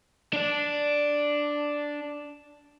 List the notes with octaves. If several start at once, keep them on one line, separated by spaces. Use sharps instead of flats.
D4 D5